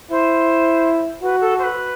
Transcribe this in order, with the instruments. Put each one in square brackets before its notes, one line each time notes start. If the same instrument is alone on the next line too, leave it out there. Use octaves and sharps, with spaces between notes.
[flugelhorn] E4 [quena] C5
[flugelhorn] F#4 [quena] B4
[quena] A4
C5
B4